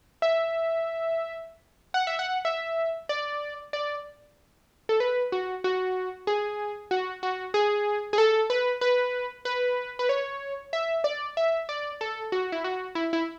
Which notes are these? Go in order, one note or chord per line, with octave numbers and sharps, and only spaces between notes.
E5
F#5
E5
F#5
E5
D5
D5
A4
B4
F#4
F#4
G#4
F#4
F#4
G#4
G#4
A4
B4
B4
B4
B4
C#5
E5
D5
E5
D5
A4
F#4
E4
F#4
E4
E4